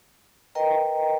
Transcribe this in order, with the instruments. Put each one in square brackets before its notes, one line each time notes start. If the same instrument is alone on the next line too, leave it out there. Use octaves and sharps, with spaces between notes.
[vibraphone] A#4 B4 D#5 G5 A#5